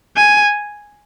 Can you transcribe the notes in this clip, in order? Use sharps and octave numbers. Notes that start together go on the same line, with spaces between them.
G#5